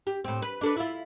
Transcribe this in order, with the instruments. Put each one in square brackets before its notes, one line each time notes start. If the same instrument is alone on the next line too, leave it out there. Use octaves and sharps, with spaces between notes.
[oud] G4
A2 C4
B4
D4 A4 B4
E4 F4